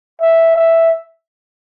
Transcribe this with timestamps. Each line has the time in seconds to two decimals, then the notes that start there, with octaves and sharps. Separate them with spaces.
0.21 E5
0.56 E5